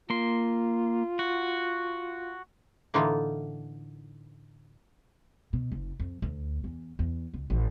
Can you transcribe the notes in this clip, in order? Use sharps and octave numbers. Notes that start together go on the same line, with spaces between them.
A#3 F4 C6
F#4
A2 D3 E3 A#3 D#4 F4
B2
F#1
F2
D2
E2
E2
C#2
A1